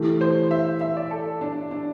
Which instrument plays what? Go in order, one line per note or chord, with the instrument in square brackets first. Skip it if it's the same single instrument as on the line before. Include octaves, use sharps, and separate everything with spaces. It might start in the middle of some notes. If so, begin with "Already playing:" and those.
Already playing: [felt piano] E3 A3 E4 G4
[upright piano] C5
E5
E5
D5
A4
D4
D4